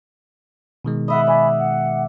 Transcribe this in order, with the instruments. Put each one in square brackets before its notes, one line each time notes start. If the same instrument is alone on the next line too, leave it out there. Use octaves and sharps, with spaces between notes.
[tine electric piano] B2 D#3 G#3
[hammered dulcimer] D#5 E5 F#5 [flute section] B5 D#6
[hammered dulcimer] D5 [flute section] G#5 B5
[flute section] F#5